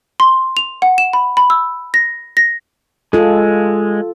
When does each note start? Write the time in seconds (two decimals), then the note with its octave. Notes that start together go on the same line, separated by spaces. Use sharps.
0.20 C6
0.57 F7
0.82 F#5
0.98 E7
1.13 B5
1.37 B5
1.50 E6
1.94 A#6
2.37 A#6
3.13 G#3 F4 A4